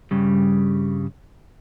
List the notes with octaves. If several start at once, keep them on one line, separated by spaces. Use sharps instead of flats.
G2 C#3 G3